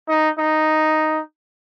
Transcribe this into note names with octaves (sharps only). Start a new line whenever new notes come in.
D#4
D#4